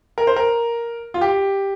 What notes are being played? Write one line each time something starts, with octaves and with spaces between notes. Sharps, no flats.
A#4
C5
A#4
F4
G4